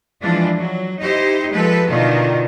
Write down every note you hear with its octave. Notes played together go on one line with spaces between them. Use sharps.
E3 F3 G#3 D4 F4
F#3
D#4 E4 G4 C5
F3 G#3 G4 A4 B4
B2 D3 D#3 D#4 F4